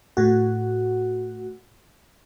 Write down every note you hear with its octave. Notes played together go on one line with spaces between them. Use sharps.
A2 F#4